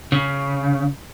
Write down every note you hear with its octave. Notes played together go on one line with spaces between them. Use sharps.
C#3